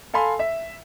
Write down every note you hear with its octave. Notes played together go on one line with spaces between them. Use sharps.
A4 F5 G#5 B5 C6
E5